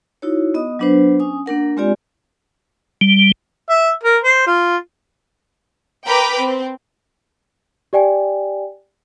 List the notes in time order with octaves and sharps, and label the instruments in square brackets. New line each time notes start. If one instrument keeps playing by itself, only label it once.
[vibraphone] D#4 E4 F#4 C#5
B3 D#5 D#6
F#3 B3 D4 B4 C5
C#4 G#5 D#6
A#3 D4 A#4 F#5
G#3 C4 F4 G4 D5 G#5
[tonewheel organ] G3
[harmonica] E5
A#4
C5
F4
[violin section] A#4 B4 G5 A#5 B5 D6
C4
[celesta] G4 D5 G5 G#5